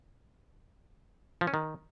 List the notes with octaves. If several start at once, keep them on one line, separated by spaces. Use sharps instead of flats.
F3
C#4
D#3